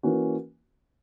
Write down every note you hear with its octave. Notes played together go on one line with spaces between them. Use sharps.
E3 A#3 C#4 F#4